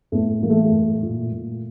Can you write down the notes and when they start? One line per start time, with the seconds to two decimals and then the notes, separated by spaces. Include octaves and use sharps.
0.12 A2 A3 B3
0.43 E3 A#3
0.50 A3
0.65 A3
0.72 A2
1.03 A#2
1.32 A#2